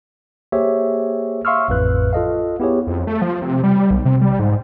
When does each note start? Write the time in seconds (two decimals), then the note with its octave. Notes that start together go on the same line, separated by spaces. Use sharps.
0.52 A#3 G4 G#4 C5 C#5 E5
1.45 E5 F5 C6 C#6 E6 F6
1.68 A1 F2 A2 B4 F#6
2.13 F4 A4 D#5 F5
2.60 B3 E4 G4 G#4 C#5
2.87 F2
3.07 A3
3.22 F3
3.42 C3
3.64 G3
3.77 G3
3.91 B1
4.05 C3
4.21 G3
4.40 G#2